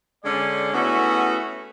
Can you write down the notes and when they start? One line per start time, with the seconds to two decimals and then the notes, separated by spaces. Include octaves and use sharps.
0.24 D3 G#3 C#4 D5
0.74 A3 B3 C#4 E4 F#4 G#4